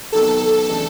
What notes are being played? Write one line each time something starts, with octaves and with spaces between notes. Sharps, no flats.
C3 D#3 F#3 B3 D#4 A4
C#3 E3 A3 D4